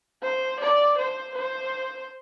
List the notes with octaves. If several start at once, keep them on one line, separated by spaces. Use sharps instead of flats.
C5
D5
C5
C5